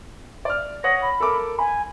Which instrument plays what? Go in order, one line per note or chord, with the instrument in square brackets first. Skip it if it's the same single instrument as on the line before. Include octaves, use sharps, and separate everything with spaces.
[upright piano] D5 F6
[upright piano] C#5 F#5 D#6 [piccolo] A#6
[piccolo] B5
[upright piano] A4 A#4 D6
[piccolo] G#5 [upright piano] B5